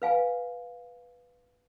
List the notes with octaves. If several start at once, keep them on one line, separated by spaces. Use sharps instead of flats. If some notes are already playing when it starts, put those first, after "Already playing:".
B4 F5 G#5